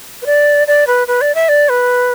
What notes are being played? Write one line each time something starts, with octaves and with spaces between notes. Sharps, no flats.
B4
D5
D5
B4
B4
D5
E5
D5
B4